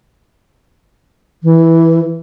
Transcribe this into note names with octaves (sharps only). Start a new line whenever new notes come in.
E3